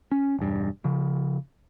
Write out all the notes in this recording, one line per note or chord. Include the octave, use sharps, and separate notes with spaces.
C#4
E1 G2
C#3 F3